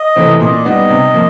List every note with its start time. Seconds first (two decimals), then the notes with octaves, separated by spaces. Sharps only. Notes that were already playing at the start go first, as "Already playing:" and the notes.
Already playing: D#5
0.16 C3 E3 A3 C4
0.40 A#2 D#5
0.52 D5
0.64 G3 B3 D#4 D#5
0.89 C3
1.14 F3 A#3